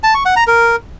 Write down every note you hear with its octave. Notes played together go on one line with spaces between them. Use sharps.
A5
C#6
F#5
A#5
A#4